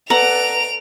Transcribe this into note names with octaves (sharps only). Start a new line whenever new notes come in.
A4 B4 D5 F#5 A#5 D7 F7